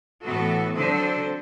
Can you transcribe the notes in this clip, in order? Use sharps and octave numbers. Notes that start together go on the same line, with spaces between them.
A2 E3 B3 F#4 A4
D3 F#3 C4 A4 C5